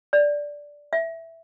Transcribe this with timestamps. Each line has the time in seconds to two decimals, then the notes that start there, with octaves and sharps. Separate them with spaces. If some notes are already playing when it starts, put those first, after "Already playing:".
0.13 D5
0.93 E5